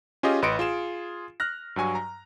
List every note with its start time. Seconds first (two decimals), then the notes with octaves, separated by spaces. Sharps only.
0.23 C#4 F4 G4 G#4 D#5
0.42 A1 B4 D#5 C6 C#7 D7
0.59 F4 G#4 E7
1.40 F6 F#6 A#6
1.76 G2 F#3 G#5 C#6
1.95 A#5